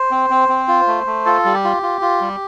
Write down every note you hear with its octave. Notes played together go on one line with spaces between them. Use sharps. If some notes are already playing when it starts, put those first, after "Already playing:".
Already playing: C5
C4
C4
C4
F4
A3
A3
F4 A4
G3
G4
F4
F4
F4
G3